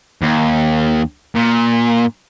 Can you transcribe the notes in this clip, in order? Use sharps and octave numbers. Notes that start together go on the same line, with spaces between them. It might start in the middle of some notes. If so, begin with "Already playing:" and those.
D#2
A#2